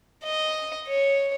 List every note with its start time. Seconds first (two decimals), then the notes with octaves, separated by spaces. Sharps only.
0.24 D#5
0.88 C#5